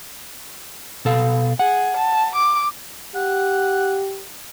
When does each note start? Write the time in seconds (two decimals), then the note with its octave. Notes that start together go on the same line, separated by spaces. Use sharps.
1.05 B2 A4 F5
1.59 G#4 F#5
1.97 A5
2.35 D6
3.15 G4 F#5